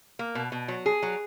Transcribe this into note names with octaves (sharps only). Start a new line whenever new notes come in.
A#3
B2
B2
F#3
G#4
F#3